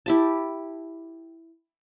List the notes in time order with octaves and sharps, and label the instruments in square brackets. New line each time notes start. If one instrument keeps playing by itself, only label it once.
[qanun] E4 G4 A5